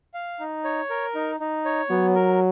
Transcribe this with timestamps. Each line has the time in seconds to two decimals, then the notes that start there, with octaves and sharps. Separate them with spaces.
0.14 F5
0.40 D#4
0.64 C#5
0.90 A#4
1.15 D#4
1.40 D#4
1.65 C#5
1.90 F#3 B3
2.15 A#4